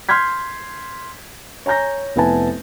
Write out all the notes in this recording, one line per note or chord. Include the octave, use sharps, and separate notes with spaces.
C6 F6 G6 G#6 B6
C#5 G#5 A#5 G6 A#6
F1 B3 E4 B4 G#5 A5